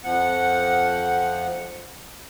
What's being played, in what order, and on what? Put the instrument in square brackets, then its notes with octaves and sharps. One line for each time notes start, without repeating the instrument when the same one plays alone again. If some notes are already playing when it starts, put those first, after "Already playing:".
[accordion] F2 F3 F#5